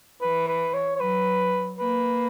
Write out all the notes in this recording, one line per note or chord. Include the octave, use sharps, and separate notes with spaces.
E3 B4
B4
C#5
C#5
F#3 B4
A#3 B4